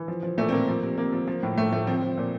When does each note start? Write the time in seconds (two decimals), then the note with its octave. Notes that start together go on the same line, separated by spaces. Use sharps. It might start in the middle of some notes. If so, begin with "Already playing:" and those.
Already playing: E3
0.08 F3
0.23 F3
0.38 A#2 A3
0.49 C4
0.52 A#2 A#3
0.68 F3
0.83 C3
0.97 C3 A#3
1.12 F3
1.27 F3
1.43 A2
1.57 A2 A3
1.72 F3 A3
1.87 F3 C4
2.02 F3
2.18 A#2